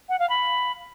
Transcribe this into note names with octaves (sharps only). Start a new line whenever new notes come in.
F#5
F5
B5